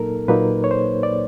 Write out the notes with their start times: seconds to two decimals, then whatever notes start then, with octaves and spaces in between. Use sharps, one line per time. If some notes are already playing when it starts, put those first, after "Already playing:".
Already playing: A#2 F#3 A#3 D#4 A4 A#4
0.28 A#2 F#3 A#3 D#4 B4
0.64 C#5
0.71 C5
1.03 D5